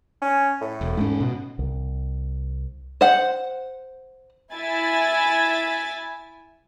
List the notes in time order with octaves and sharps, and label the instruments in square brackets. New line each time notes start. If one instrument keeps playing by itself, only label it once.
[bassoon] C#4
A2
[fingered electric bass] E1
G#2 C#4
B2
C2
[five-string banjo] C5 F#5
[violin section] E4 E5 G#5 A6